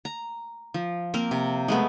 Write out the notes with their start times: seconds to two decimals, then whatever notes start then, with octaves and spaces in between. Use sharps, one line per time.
0.05 A#5
0.74 F3
1.14 A#3 C4 A#4
1.31 C3
1.68 G#3 A3 B3